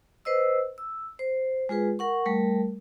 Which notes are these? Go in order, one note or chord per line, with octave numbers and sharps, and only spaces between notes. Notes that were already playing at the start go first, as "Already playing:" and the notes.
B4 C5 D#5 E6
E6
C5
G#3 F4 G#4 B4
A#4 F#5 C#6
G3 A3 A#4